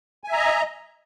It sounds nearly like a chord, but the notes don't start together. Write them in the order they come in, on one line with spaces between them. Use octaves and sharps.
G#5 E5 A#5 D#5